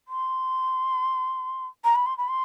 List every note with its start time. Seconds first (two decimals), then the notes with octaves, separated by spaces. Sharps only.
0.08 C6
1.84 A#5
1.95 B5
2.06 C6
2.18 B5
2.29 C6